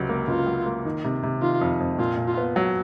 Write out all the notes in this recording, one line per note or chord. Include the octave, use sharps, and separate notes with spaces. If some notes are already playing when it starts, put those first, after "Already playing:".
Already playing: C#2 C3 F#3
A#3
C#2 F4
F#3
A#3
D#3
C3
C3
D#3 F4
F2
F2
A#2 F4
A#2
F4
B3
F#3